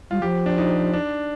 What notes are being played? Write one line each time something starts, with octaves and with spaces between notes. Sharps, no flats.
G3 F4
F3 G4
D4
D#4
D4